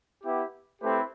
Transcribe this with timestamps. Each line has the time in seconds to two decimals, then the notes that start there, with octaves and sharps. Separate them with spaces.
0.23 B3 E4 G4
0.81 A3 C4 E4 G4 B4